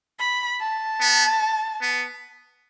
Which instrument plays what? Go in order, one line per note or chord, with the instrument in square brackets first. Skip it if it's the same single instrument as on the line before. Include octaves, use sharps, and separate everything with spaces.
[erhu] B5
A5
[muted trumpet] B3
B3